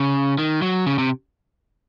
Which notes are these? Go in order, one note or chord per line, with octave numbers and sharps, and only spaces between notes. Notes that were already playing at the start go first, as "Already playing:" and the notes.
Already playing: C#3
D#3
F#3
C#3
C3